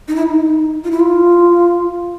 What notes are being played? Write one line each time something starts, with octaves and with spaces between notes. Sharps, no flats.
D#4
E4
D#4
F4
E4
F4